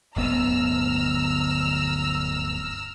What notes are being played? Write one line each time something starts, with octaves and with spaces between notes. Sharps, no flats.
D1 G1 B3 A#5 E6 F6